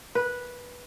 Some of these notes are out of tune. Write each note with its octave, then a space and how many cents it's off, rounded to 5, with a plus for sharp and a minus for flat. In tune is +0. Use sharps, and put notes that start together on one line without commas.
B4 -10